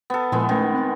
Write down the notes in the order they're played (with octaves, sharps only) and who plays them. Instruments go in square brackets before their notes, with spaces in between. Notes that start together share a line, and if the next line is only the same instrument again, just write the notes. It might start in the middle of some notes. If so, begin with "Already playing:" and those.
[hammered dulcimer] B3 A4
[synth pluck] A#2 F3 A#4 [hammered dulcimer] G#3 B3 E4
[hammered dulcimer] D#3 [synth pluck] A3 C#4 D#4
[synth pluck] C4 F#6 A6